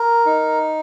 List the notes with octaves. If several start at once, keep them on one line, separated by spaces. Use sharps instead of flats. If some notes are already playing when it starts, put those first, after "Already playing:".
Already playing: A#4
D#4